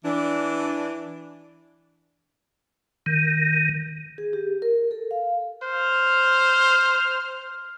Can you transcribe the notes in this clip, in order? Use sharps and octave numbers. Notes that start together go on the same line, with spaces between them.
E3 D4
D#3
G#4
G4
A#4
A4
F5
C5 F6